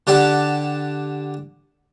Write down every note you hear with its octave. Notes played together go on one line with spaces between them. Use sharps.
D3 G4 D5 F#5 A5